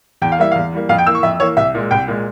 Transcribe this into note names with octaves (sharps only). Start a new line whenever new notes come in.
E2 G5
F5
E3 G3 A#3 E5
E2 F5
E3 G3 A#3
F2 F5
G5
E3 A#3 E6
C#6
F2 E5
E3 A#3 C#5
C2 E5
A#2 G#3
C2 G5
A#2 G#3